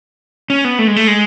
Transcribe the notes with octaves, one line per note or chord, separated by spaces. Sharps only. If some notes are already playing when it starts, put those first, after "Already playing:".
C#4
B3
A3
G#3
A3
G#3